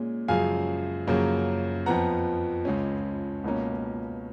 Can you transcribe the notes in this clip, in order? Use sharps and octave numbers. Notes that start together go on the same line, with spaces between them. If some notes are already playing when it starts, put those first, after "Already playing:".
Already playing: A#2 G#3 C#4
F#2 C#3 F3 G#3 F5 G#5
F#2 C#3 F3 A#3 C#4
F2 F3 B3 F#5 A#5
C#2 C#3 G#3 C#4
C#2 B2 A#3 C#4